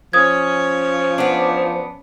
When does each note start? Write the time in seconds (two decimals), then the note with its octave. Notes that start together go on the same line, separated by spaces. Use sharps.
0.13 F3 C#4 C#5 D#6 G#6
1.18 B3 D4